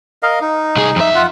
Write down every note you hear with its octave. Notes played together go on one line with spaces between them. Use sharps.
A#4 D#5 F5
D#4
C2 G#4
F2 E5
F4 F#5